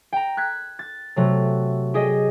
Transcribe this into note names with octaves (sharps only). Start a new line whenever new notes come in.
G5 A#5
F#6 G#6 B6
A6
C3 F#3 A3
G4 G#4 D#5